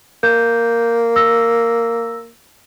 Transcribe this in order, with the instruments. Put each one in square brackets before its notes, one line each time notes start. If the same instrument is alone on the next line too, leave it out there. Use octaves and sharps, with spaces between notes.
[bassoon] A#3 [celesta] G6
[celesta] E6 A#6